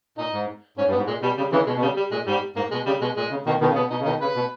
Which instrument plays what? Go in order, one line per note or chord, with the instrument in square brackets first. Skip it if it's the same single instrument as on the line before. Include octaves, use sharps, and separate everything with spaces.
[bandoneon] A#2 [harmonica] D#4
[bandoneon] G#2
[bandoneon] G#2 [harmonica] C#4
[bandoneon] G2
[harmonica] B3
[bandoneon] G#2
[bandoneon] A#2 [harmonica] G#3
[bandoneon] B2 [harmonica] G3
[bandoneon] C#3 [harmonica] G3
[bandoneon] C#3 E3 [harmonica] G#3
[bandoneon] B2 [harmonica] G#3
[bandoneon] B2
[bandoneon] C#3 [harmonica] G3
[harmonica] G3
[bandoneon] A#2 [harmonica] G#3
[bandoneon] G#2 [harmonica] G3
[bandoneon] G#2 [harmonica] A#3
[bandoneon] B2 [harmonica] G#3
[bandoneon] C#3 [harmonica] G3
[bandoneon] B2 [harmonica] G#3
[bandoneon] A#2 [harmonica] G#3
[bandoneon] C#3
[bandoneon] B2 D#3 [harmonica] A#3
[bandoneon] B2 D#3 [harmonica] B3
[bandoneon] C#3
[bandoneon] B2 [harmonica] B3
[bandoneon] B2 [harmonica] D#4
[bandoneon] C#3
[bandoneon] B2 D#3 [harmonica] D#4
[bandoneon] C#3 [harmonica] B4
[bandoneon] B2